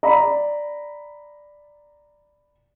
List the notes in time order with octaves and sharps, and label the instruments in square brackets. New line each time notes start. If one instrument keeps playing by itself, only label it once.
[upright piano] D5 A#5 B5